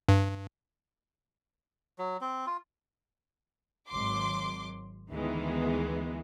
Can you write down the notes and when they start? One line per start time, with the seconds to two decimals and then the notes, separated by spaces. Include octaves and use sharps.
0.08 G2
1.99 F#3
2.21 C4
2.47 F4
3.89 G#1 F#3 C6 D6
5.10 D2 D#3 E3 G#3 B3